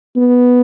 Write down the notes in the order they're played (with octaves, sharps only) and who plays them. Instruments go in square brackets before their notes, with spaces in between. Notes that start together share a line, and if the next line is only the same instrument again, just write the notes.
[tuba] B3